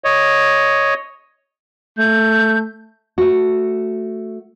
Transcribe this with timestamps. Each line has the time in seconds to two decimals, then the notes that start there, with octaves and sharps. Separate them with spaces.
0.04 C#5 D#5
1.98 A3 G6
3.18 A3 F#4